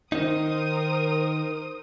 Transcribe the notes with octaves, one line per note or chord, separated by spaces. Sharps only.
D#3 D#4 A#4 C5 D#6